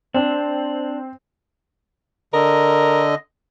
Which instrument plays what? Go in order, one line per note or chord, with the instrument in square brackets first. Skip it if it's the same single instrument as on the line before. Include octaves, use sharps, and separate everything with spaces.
[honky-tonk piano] C4 [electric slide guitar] D4
[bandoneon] D3 D#5 [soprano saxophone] A#4